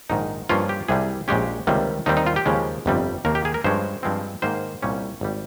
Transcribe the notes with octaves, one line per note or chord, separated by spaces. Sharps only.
A#1 G#2 D#3 D#4
G2 F3 A#3 C#4 F4
G4
C2 C3 G3 G#4
A#1 A#2 G#3 C#4 G4
C#2 C3 D#3 G3 A#3
D#2 D#3 G3 C4 D#4
D#4
F4
G4
D#2 C#3 F3 G#3
G1 F2 C3 G3
D#2 D#3 A#3 A#4
G4
G#4
A#4
G2 F3 G#3 C#4 C5
G2 F3 G#3 C4
G#2 D#3 A#3 C5
C2 A#2 G3 C#4
G#1 G3